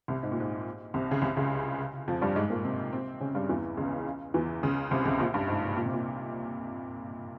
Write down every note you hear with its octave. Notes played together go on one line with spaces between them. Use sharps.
C2 C3
G#2
A#2
G#2
C2 C3
C#3
C2 C3
C#2 C#3
F2 F3
G2 G3
G#2 G#3
A#2 A#3
C3 C4
C3 C4
C#3 C#4
G2 G3
E2 E3
C#2 C#3
E2 E3
C#2 C#3
C2 C3
C#2 C#3
A#1 A#2
G2
G#2
A#2
C3
A#2